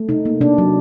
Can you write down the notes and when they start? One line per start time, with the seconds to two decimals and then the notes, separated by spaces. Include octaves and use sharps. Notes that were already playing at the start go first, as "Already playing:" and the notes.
Already playing: A3
0.09 C3 D#4
0.25 A#3
0.41 C3 D4
0.58 F#3